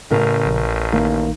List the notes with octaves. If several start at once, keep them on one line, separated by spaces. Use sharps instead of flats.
A1 A2 C#3 A#4
A#1
D#3 A#3